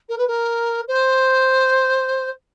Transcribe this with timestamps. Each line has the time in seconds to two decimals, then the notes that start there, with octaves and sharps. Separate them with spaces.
0.09 A#4
0.18 B4
0.27 A#4
0.88 C5